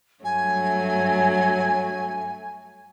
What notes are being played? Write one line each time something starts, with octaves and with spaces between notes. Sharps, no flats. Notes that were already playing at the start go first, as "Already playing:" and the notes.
G2 F#3 A3 G#5